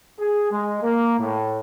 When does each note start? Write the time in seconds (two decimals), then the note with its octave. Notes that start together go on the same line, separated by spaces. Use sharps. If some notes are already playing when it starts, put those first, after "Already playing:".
0.19 G#4
0.51 G#3
0.82 A#3
1.19 A2